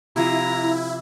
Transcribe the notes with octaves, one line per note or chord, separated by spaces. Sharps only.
C3 F3 E4 D#5 A#5